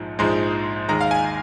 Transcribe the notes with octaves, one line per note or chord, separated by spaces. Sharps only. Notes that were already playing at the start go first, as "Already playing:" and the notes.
Already playing: A#1 G#2 F3 G#3
A#1 G#2 F3 G#3 C6
D#2 D#3 G#3 A#5
F5
G#5